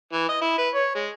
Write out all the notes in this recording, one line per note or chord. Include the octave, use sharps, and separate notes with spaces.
E3
D#5
E4
B4
C#5
G#3